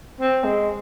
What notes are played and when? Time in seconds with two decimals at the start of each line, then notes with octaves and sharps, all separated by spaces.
0.21 C4
0.44 G#3